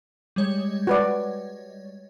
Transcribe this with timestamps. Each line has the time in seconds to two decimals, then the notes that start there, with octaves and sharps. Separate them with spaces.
0.36 G3 G#3 C#5
0.87 F#4 B4 D5